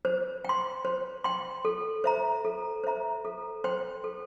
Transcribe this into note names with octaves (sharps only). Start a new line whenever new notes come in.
C5
G5 C6
C5
G5 C6
A4
C5 E5 A#5
A4
C5 E5 A#5
A4
C5 G5 C6
A4